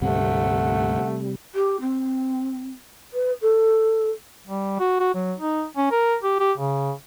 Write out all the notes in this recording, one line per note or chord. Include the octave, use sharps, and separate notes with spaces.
D2 G#2 C3 G3 A3 C4 F#5
G4
C4
B4
A4
G3
F#4
F#4
F#3
D#4
C#4
A#4
G4
G4
C#3